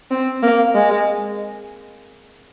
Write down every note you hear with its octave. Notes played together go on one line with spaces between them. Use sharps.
C4
A#3
G#3